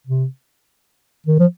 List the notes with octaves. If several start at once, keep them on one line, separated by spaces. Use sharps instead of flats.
C3
D#3
F3